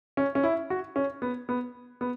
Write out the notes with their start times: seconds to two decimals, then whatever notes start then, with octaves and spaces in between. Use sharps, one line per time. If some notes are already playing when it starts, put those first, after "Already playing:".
0.17 C#4
0.35 C#4
0.43 E4
0.70 F#4
0.96 C#4
1.22 B3
1.49 B3
2.01 B3